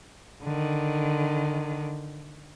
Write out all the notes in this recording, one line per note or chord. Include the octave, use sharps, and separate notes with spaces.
D3 D#3